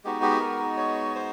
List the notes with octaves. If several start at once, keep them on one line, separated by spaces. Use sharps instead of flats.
G#3 B3 D#4 F#4 G4
G4
A#4
C#5
C5